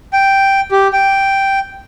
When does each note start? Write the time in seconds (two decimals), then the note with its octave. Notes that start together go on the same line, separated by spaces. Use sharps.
0.13 G5
0.71 G4
0.93 G5